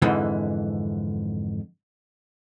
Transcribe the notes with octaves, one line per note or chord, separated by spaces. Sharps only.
F2 G#2 D3 E3